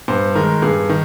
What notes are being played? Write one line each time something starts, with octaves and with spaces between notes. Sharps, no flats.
G2 C5
D#3 G#3 A#4
G2 G#4
D#3